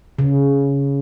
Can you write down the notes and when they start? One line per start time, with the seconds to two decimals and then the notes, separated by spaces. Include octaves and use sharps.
0.19 C#3